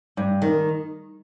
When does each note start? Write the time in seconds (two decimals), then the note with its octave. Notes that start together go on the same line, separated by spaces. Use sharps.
0.17 G2
0.42 D#3